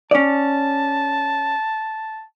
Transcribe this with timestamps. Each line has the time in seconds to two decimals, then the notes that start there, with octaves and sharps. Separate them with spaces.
0.11 C#4 D5 A5